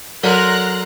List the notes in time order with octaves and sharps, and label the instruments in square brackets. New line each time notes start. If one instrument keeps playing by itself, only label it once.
[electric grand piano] F#3 A#4 [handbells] A4 D5 F#5 [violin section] A#5 C6 F#6